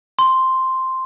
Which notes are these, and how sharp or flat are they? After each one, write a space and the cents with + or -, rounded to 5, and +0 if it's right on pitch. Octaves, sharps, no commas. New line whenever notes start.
C6 +0